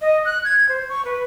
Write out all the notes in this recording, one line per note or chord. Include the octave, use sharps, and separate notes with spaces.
D#5
F#6
G#6
C5
C#6
B4